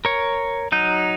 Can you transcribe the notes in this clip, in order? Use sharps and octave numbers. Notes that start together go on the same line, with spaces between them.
A#4 C#5
F#3 D#4 G6